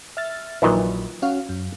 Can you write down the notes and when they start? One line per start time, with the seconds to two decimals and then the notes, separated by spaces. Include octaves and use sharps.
0.17 E5 F6 A6
0.62 A#1 A#2 D#3 E3 F#3 B4
1.22 C#4 F#4 F5
1.49 F#2